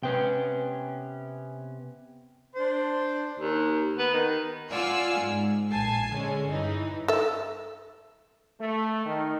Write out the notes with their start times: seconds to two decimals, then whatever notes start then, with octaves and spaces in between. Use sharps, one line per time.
0.03 C3 B3 C#4 B4 G5
2.56 D4 C5
3.40 D#2
3.98 B3
4.14 D#3
4.70 F4 D5 F#5 G#5 E6 F6
5.20 G#2
5.71 A#1 G#5 A5 C7
6.13 D3 G#3 C#4
6.49 G2 E3 D#4
7.08 A4 E5
8.60 A3
9.05 D#3